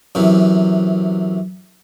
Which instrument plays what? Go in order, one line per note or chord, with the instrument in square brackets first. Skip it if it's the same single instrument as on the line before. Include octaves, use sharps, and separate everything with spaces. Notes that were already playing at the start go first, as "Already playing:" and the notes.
[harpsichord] F#2 C3 E3